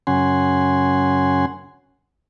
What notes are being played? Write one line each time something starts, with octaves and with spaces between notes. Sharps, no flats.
F#2 C#3 C#4 F#5 G#5 C6